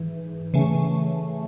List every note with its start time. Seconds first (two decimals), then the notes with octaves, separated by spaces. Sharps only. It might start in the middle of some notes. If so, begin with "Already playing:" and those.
Already playing: G#2 E3
0.54 C#3 E3 A3 C#4